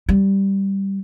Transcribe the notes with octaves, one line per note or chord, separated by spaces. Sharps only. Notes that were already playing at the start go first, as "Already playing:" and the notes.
G3